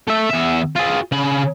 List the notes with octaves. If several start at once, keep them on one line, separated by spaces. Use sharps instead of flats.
A3 E5
E2 E5
F4 G#4
C#3 B5